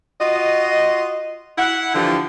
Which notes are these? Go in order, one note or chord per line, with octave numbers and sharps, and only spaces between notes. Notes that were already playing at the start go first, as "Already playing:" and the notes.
F4 F#4 D#5
E4 F#5
D3 E3 F3 F4 G4